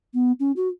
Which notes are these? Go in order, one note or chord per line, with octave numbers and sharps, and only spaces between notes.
B3
C#4
F#4